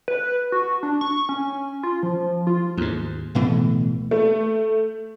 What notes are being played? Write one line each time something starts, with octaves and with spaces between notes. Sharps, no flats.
B4
F#4
D4
C#6
C#4
F4
F3
F4
D#2 G#2
D1 B2 E3 A3
A3